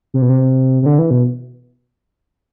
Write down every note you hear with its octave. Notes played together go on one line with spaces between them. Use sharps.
C3
B2
C3
C3
D3
E3
B2